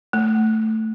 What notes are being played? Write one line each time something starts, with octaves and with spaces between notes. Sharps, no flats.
A3